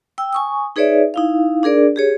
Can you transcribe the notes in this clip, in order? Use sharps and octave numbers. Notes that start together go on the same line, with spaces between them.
G5 E6
G#5 C#6 D#6
D#4 G#4 B4 C#5 D5 E5
D#4 E4 F5
D4 G#4 A#4 D5
G4 G#4 C#5